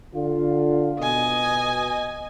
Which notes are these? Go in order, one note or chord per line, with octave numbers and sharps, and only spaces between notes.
D3 F4
B2 D#5 G#5